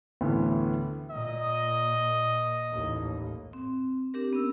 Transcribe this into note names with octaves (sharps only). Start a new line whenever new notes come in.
D2 A2 E3 B3
A#2 D#5
A1 D#2 A2
C4
C4 D4 G4 A#4
B3 C#4 E6